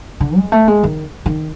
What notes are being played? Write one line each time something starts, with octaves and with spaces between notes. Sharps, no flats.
D3
G#3
A3
G#3
D#3
D#3